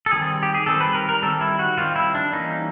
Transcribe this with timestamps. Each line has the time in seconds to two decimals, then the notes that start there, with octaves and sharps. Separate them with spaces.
0.06 A4
0.11 D#3 G3 C4 G#4
0.43 G4
0.54 G#4
0.66 D#3 G3 C4 A4
0.81 B4
0.95 A#4
1.09 A#4
1.22 D#3 G3 C4 A4
1.41 E4
1.59 F#4
1.77 D#3 G3 C4 F4
1.96 E4
2.15 D4
2.32 E3 G3 A#3 C#4 D#4